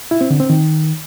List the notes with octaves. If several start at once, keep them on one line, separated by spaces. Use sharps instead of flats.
E4
C4
D3
C4
D#3